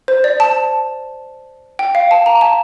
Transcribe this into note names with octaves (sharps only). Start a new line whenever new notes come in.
C5
D5
A5
G5
F5
A5
A#5
A5